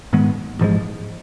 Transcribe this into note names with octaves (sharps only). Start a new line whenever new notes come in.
G#2 D#3 G#3 B3
A1 G#2 F3 G#3